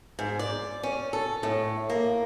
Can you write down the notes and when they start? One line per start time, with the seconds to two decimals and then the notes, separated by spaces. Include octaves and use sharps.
0.19 G#2
0.39 D5
0.83 C#4
1.13 A4
1.43 A2
1.90 A#3